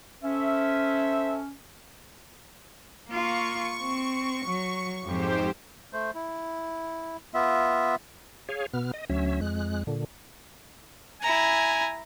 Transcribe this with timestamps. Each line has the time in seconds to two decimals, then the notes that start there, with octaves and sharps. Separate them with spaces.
0.24 C#4 A4 C5 E5
3.09 A#3 F4 C#6
3.82 C4
4.46 F#3
5.04 F2 G#2 G4 C5
5.93 A3 C5
6.15 E4
7.34 B3 F4 E5
8.49 G#4 C#5 F5
8.73 B2 B3 F6
8.94 D#5
9.10 D2 F#3 C#4 E5
9.41 F2 G#3 F#6
9.87 A#2 D3
11.22 E4 G#5 A#5